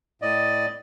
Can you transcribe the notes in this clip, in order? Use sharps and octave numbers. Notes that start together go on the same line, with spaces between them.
A2 D5 D#5